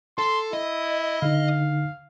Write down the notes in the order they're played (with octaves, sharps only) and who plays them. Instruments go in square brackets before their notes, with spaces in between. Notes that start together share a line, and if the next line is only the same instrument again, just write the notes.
[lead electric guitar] A4 [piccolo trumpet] C6
[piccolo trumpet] E4 [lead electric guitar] D#5
[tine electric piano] D3 D#4 [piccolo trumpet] F5